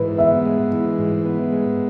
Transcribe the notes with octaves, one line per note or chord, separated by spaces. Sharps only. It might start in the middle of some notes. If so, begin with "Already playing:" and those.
Already playing: G#2 E3 B4
B3 E5
G#3
E3
G#2
B3
G#3